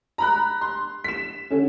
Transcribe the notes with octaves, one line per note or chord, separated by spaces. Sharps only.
A#5 B5 F#6
C6
B6 E7
D3 C#4